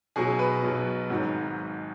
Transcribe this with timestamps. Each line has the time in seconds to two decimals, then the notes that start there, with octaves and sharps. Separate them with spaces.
0.16 B1 B2 F#3 G#4
0.39 B4
0.63 B1 B2 F#3
1.10 G#1 G#2 F#3